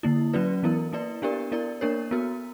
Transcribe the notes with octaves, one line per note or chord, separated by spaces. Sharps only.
D3 A#3 E4
F#3 C#4 F#4 B4 D5
E3 B3 E4 A#4
A#3 E4 B4 D5
B3 D4 G4 A#4 D5
B3 E4 A#4 D5
A#3 D4 A#4 C#5
B3 F#4 A#4